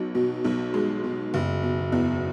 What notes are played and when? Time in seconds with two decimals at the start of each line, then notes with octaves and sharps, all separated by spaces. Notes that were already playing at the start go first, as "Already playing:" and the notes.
Already playing: B1 F#3
0.15 B2
0.44 B1
0.74 G#3
1.04 B2
1.34 F#1
1.63 B2
1.92 E2